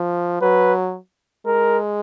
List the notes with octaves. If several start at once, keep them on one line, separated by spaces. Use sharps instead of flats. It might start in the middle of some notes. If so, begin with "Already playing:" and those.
Already playing: F3
F#3 B4
G#3 A#4